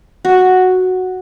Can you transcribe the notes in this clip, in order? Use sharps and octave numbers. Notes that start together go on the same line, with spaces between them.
F#4